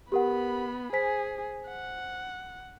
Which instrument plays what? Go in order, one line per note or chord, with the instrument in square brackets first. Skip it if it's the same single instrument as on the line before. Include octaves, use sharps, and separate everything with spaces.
[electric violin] B3 B5 [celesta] G4 A#4 F#5
[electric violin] G#4 [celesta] C5 G#5 B6
[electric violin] F#5